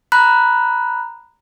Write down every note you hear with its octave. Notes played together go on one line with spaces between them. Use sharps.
A#5 B5 F#6